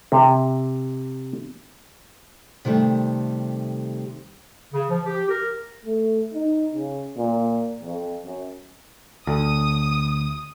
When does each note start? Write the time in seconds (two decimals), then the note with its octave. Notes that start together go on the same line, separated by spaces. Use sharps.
0.12 C3
2.65 C3 D#3 G3 A3
4.73 C#3
4.90 F3
5.06 G4
5.29 A#4
5.85 A3
6.34 D#4
6.74 C#3
7.18 A#2
7.82 F2
8.24 F#2
9.27 D2 D#6